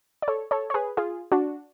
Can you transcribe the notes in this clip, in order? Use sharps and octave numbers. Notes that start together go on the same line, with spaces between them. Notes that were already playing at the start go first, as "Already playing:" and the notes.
D5
A4 C#5
A4 C#5
C#5
G#4 B4
F4 G#4
D4 F#4